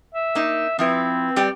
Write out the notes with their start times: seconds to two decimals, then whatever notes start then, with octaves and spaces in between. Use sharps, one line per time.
0.15 E5
0.35 A#3 D#4
0.79 F3 C4 E4 B4
1.36 G3 G4 D5